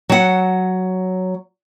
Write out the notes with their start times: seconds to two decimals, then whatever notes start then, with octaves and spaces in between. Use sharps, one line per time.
0.10 F#3 F#5